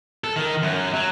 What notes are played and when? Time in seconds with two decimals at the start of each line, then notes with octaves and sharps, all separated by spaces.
0.24 A4
0.36 D#3
0.63 F#2
0.94 F#3